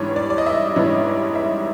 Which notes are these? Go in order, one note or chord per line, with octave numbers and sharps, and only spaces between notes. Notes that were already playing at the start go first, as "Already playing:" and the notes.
Already playing: G#2 E3 G3 B3 D4 C#5
D5
D5
D#5
E5
G#2 E3 G3 B3 D4 C#5
E5